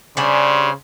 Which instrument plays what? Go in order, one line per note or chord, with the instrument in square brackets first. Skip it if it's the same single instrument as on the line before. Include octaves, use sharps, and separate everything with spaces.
[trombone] C#3 [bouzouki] G3 D4 [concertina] C5 G#5 C6